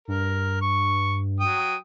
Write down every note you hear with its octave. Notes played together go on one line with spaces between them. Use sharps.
G2 A#4
C#6
F#3 G5 D#6